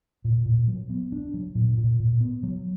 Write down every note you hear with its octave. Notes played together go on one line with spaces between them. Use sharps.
A#2
A#2
F#3
B3
D4
F#3
A#2
A#2
A#2
B3
F#3